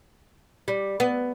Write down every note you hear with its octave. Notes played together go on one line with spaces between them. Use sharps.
G3
B3